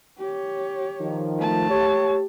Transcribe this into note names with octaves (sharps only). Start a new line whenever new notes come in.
G4 C#5
D#3 F3
A3 A5
G4 C#5